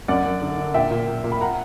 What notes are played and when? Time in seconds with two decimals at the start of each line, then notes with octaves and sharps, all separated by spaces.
0.08 F#2 D5 F#5
0.26 F#2
0.42 D3
0.58 D3
0.74 A#2 E5 G5
0.91 A#2
1.08 A#2
1.24 A#2
1.32 B5
1.41 F#5 A#5